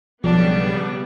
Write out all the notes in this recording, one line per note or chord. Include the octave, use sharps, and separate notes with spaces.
B1 C#3 F3 G3 B3 D4